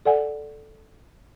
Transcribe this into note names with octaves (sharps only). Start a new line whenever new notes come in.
A4 D5 F#5 G#5